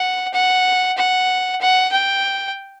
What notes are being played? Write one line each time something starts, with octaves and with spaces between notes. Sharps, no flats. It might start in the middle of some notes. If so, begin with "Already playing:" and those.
Already playing: F#5
F#5
F#5
F#5
G5